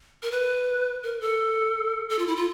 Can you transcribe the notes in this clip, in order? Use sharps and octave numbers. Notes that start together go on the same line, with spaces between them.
A#4
B4
A#4
A4
A4
F4
E4
F4